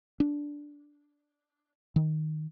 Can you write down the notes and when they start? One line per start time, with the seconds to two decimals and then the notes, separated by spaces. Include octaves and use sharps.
0.20 D4
1.96 D#3